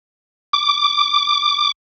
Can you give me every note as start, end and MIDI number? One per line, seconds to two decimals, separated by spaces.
0.53 1.72 86